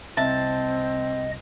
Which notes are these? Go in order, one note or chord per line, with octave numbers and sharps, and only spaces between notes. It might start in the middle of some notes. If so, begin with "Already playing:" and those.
C2 C4 D#5 E5 A5